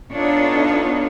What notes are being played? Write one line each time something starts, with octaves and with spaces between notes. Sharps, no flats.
B3 D4 D#4 F4 A4 C#5